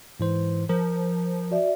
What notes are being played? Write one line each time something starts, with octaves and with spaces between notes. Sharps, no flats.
G#2 E3 C5
F3 A#4
F#4 D5 E5